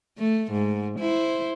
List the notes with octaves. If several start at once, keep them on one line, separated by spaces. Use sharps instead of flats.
A3
G#2
E4 C5